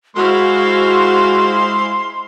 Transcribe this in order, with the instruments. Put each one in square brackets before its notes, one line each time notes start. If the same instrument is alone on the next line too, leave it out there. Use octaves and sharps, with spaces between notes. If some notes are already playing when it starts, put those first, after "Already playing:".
[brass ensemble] G#3 [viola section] E4 C5 F5 [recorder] F#4 [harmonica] C6